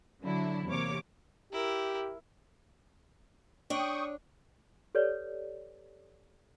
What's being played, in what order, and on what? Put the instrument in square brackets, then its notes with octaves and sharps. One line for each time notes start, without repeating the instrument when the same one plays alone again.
[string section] D3 F#3 D4 E4
E2 C3 A#3 C#5 D6
[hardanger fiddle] E4 A#4 [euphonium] G4
[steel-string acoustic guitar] D4 C#5 [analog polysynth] G5 C#6 D#6
[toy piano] G4 A4 B4 C#5 D5